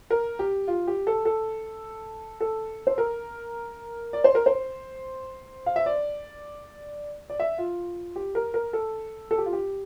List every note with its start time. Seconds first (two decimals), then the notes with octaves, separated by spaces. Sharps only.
0.10 A#4
0.39 G4
0.68 F4
0.87 G4
1.07 A4
1.25 A4
2.40 A4
2.87 C5
2.98 A#4
4.13 D5
4.24 C5
4.35 A#4
4.46 C5
5.66 F5
5.76 E5
5.86 D5
7.30 D5
7.40 E5
7.58 F4
8.16 G4
8.35 A#4
8.54 A#4
8.73 A4
9.31 A4
9.38 G4
9.46 F4
9.53 G4